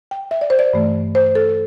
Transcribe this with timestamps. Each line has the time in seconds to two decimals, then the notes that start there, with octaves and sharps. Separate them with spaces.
0.11 G5
0.31 E5
0.41 D5
0.50 C5
0.59 D5
0.73 G2 E3 A3
1.15 C5
1.35 A4